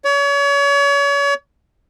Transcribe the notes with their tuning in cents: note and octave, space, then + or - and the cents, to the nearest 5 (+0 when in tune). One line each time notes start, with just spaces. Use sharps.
C#5 +35